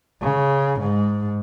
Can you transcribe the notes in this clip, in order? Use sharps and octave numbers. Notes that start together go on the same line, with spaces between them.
C#3
G#2